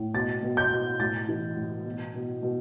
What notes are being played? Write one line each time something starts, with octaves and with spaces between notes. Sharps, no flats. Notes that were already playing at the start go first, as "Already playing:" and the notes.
Already playing: A2
B2 A6
B2
G6
B2
A2 A6
E3
A2
B2
B2
B2